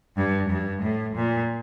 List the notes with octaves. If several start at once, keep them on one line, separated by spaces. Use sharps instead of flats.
G2
G2
A2
A#2